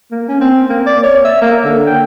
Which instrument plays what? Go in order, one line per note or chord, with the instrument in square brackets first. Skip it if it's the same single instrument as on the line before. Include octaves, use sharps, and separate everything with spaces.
[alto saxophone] A#3
C#4
C4
A#3
D5
C#5
E5
A#3
D3
G5